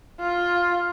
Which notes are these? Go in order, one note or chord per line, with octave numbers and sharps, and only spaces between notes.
F4